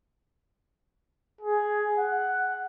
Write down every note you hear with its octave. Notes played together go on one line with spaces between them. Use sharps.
G#4
F#5